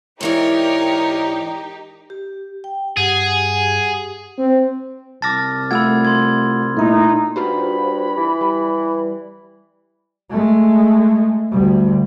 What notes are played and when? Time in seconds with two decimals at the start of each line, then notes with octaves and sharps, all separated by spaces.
0.21 G#2 E3 D#4 G4 A#4 C#5 D5
2.10 G4
2.64 G5
2.97 G2 G4 G#4 F#5 G#5
4.39 C4
5.22 C2 A5 D6 F6 A6 A#6
5.71 A3 F4 F#5 B5 E6 G#6
6.05 C6 G#6
6.77 A#2 A3 D#4 E4
7.36 G2 F4 F#4 C5 B5
8.17 E3
8.41 G3
10.30 G#3 A3
11.52 D2 G3